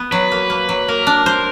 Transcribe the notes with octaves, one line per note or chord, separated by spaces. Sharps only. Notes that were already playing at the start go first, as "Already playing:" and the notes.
Already playing: B3
F#3 B4
A#3
A#3
F#3
A#3 A#4
D4
C5